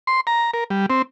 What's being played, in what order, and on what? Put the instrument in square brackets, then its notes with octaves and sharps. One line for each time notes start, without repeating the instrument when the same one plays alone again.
[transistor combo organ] C6
A#5
A#4
G3
C4